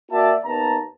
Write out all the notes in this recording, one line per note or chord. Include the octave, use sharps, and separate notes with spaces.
A#3 F#4 D5 E5 G5 A5
D#2 B3 A5 A#5